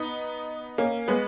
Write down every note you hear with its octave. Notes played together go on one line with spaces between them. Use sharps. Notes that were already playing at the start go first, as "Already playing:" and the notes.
Already playing: B3 D#4
A#3 C#4
G#3 B3